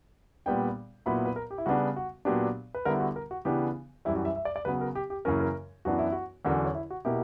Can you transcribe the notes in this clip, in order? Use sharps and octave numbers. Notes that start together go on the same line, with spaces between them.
A#2 G3 B3 D4 G5
A#2 F#3 B3 E4 B5
B4
A#4
G4
E4
C#3 G3 B3 D4 F#4
F#4
A#2 F#3 B3 D4 G4
B4
D3 G3 B3 E4 A#4
F#4
A#4
F#4
C#3 E3 B3 D4 G4
F#2 E3 G3 E4
F#4
E5
E5
D5
D5
C#3 F#3 B3 B4
A#4
G4
G4
F#2 C#3 E3 A#3 C#4 A#4
A#4
F#2 E3 B3 D4 F#4
E4
F#4
E2 D3 F#3 C#4 A#4
C#5
E4
F#4
B2 A#3 E4 G4